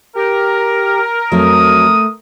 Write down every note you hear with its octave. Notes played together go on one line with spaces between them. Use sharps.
G4 A#4
F2 F#3 A3 D#6